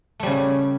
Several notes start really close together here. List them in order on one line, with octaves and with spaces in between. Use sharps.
A3 G3 C#3